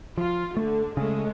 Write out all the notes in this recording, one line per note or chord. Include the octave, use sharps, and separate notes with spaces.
F3 F4
D3 A3
C#3 G#3 A3 C#4